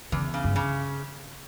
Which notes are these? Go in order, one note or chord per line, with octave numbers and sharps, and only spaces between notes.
E2 C#3
C#3
G2
C#3